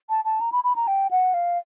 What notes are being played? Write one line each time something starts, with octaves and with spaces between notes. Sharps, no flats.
A5
A5
A#5
B5
B5
A#5
G5
F#5
F5